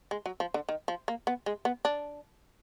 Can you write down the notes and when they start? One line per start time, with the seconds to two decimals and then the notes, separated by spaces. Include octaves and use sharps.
0.11 G#3
0.26 F#3
0.40 F3
0.54 D3
0.69 D#3
0.88 F3
1.08 A#3
1.27 B3
1.46 G#3
1.65 B3
1.85 D4